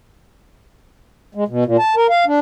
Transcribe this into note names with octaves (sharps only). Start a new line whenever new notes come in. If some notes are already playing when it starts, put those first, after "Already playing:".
G#3
B2
A#2
A5
A#4
F5
D4